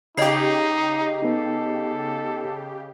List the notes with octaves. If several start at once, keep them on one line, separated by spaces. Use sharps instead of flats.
C#3 D#4 G4 D#5 C7
B3 D#4 A4